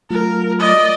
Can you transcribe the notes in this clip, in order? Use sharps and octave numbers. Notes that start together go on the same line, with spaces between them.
F#3 A3 F4 A#4
D5 D#5